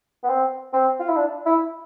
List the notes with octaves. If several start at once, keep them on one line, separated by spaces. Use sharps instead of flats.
B3
C4
C4
F4
E4
D4
E4